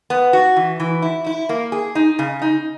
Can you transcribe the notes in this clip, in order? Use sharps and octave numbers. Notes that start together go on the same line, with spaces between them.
B3
F#4
E3
E3
E4
E4
A#3
G#4
D#4
C#3
D#4